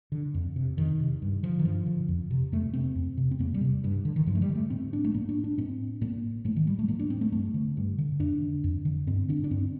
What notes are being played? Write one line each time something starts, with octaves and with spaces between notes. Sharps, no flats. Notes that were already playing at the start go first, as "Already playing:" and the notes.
D3
F2
C3
F2 D#3
C3
G2
D3 F3
D#3
G2 F3
D3
F2
C3
F2 A3
C3 C4
F2
C3
C4
F2 A#3
G3
C3
G2
D3
D#3
G2 F3
A3
G3
D3
A3
A2 C4
D4
A3
A2 A#3
D4
D4
A2 C4
A2 A#3
A2 A3
D#3
G3
A3
A2 A#3
D4
C4
A3
G2 A3
D3
G2
D3
F2 D4
D3
F2
D3
G2 C4
D3 D4
D4
G2 C4